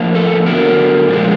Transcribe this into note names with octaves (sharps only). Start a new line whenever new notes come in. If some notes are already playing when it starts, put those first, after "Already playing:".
Already playing: A2 F3 A#3
A4
D3 F#3 B3 A#4
A#2 F3 G#3